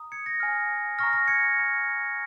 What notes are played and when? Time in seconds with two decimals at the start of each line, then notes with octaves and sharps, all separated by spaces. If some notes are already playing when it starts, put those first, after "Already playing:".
Already playing: A#5 D#6
0.12 G#6 C#7
0.26 A#6
0.40 G#5 F6
0.98 A#5 C#6 F6 A#6
1.13 A#6
1.28 G#6 C#7
1.56 A#5 F6